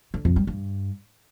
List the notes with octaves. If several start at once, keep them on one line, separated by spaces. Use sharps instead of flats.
D3
F2
G3
G2